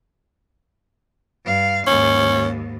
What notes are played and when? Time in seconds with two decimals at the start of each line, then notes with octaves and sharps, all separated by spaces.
1.44 G2 F5
1.87 D#2 G#2 C#4